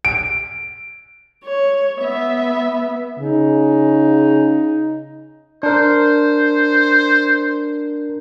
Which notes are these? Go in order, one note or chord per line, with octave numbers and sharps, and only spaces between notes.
D7
C#5
B3 E5
C#3 D#4
D4 A#4 C5